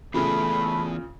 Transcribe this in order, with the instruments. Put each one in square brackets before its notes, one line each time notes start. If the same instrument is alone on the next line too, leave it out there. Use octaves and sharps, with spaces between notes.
[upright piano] A#2 C#3 [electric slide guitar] E3 B3 G#4 [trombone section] A3 [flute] B5